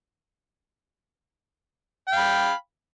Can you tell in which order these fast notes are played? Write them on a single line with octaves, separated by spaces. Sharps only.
G5 F5 B5